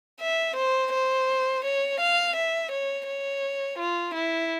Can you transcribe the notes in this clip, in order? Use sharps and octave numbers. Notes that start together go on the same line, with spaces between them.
E5
C5
C5
C#5
F5
E5
C#5
C#5
F4
E4